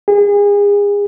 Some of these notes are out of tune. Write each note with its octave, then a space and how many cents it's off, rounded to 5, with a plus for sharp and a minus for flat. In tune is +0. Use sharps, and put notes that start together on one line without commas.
G#4 -35